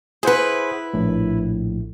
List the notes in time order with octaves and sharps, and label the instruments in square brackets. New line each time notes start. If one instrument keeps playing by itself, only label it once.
[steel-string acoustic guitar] E4 B4 [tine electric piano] G#4 C5 F#5
[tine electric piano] A#1 A2